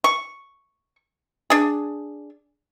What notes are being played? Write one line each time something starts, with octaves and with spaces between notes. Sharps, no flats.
C#6
D4 G#4